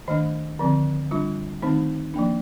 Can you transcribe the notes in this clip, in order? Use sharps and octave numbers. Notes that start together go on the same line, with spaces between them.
D#3 A3 D4 D#5
D3 F3 C4
G3 D4 F4
D#3 A3 C4 D#4
F3 A#3 D4